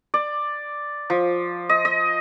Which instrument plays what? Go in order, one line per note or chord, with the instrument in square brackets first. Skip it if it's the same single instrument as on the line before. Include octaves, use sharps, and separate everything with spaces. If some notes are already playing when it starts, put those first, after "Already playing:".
[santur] D5
F3
D#5
D#5